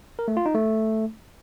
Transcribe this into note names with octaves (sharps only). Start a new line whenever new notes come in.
A#4
A3
F4
D#4
A3